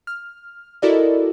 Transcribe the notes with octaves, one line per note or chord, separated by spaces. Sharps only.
F6
E4 F#4 A4 A#4 D5 D#5